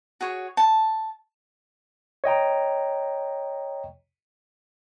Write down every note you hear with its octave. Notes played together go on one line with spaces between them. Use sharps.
F#4 G#4 C#5
A5
C#5 D#5 G5 A#5